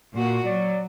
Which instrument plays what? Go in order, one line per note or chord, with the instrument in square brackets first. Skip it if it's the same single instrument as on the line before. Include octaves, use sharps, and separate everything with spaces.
[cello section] A#2 F#4
[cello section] F#3 [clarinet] D5